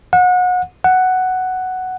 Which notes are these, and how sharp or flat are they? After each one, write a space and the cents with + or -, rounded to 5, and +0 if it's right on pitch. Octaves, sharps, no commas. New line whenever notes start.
F#5 -30
F#5 +5